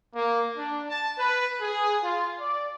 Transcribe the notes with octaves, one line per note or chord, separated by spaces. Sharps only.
A#3
D4
A5
B4
G#4
F4
D5